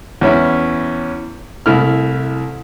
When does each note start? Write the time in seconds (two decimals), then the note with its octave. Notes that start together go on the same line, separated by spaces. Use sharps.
0.21 E2 C#4 E4
1.66 C2 A3 E4 F6